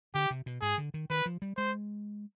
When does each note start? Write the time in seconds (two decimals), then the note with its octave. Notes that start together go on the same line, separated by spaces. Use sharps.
0.15 D3 G4
0.30 C3
0.46 B2
0.61 G#2 G#4
0.78 D3
0.94 D#3
1.10 D#3 B4
1.26 F3
1.42 G3
1.57 G#3 C5